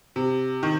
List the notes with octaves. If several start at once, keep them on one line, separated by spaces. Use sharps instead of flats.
C3
D#3